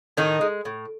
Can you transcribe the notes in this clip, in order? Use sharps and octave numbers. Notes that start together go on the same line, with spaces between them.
A2 D#3 D#4
G#3
A2